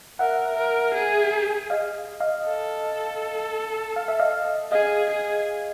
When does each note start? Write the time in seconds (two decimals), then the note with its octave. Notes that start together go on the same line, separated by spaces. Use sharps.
0.19 A#4 E5 F#5
0.57 A#4
0.95 G#4
1.70 D#5 F5
2.20 D#5 F5
2.46 A4
3.96 F5
4.08 E5
4.20 D#5 F5
4.72 G#4 D#5 F5
5.10 G#4